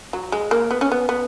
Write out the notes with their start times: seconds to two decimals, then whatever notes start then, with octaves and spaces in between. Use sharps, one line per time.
0.13 F#3
0.32 G#3
0.51 A#3
0.71 B3
0.81 C#4
0.92 B3
1.09 B3